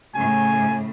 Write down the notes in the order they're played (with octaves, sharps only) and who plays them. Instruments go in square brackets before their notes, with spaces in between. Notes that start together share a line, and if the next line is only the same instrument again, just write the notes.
[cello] A2 C#3 [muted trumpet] G#5